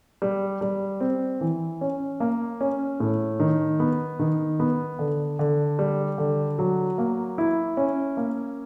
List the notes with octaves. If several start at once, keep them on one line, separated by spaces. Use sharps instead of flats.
G3
G3
C4
E3
C#4
A#3
C#4
A2
D#3
B3
D#3
B3
D3
D3
G3
D3
F#3
A#3
E4
C#4
A#3